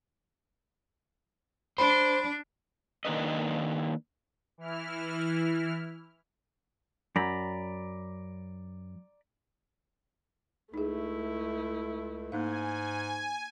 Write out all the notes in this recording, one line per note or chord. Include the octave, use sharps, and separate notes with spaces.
D4 C5 B5
D#3 A#3 D4 B4 D#5
E3 E4 F6
F#2 D5 A#5 B5
C#2 A3 D#4 E4 G#4
G#2 A#3 D#4 F5 G#5